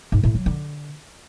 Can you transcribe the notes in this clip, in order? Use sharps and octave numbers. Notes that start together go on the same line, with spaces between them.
G#2
A2
F#3
D3